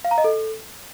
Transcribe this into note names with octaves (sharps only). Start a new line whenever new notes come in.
F5
A#5
D#5
A4